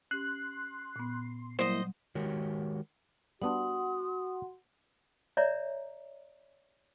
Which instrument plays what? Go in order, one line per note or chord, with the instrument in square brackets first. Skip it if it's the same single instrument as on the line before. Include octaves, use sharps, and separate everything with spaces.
[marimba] C#4 G4 [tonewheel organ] C6 [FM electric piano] F#6
[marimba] A#2 B3
[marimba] F#3 G3 [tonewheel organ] A#3 E4 [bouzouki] C5 D#5
[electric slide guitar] D#3 G#3 F#4 G4 A#4 C#5
[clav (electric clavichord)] G3 B3 D4 [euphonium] F#4 [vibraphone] F#5 C6 [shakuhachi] D#6
[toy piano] C#5 D5 E5 A#5